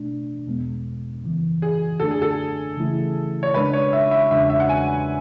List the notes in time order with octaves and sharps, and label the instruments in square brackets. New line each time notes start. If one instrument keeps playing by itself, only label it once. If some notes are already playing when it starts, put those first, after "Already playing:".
Already playing: [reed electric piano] B2 A3 D4
E2 B2 G#3 B3
F#2 C#3 E3
[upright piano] G#4
[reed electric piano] F#2 D3 A3 D4 [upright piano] A4
[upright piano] G#4
A4
[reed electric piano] C#3 E3 A3 E4
[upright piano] C#5
[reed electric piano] C#3 G#3 D4 [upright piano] B4
[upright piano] C#5
E5
E5
[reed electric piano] E2 C#3 G#3 D4 [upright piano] E5
[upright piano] E5
F#5
G#5